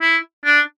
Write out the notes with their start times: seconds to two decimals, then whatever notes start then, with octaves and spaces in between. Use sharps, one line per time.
0.01 E4
0.45 D4